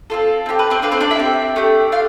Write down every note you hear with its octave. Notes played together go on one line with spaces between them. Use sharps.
C4 F4 A4
C4 E4 G4
B4
C4 C5
D4 F4 A4 B4
C4 C5
D4 D5
E4 E5
C4 G4
A3 D4 G4
D4 F4 F5